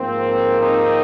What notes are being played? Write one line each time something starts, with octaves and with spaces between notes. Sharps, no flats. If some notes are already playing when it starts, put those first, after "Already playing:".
Already playing: G#2 F3 A#3 C4
C4 D#4